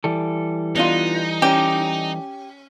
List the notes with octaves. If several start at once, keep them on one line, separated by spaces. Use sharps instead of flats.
E3 G3 A4
B3 D4 D#4 F4
C#4 G4